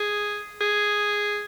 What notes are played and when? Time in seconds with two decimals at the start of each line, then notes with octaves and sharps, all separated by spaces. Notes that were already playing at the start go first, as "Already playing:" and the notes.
Already playing: G#4
0.61 G#4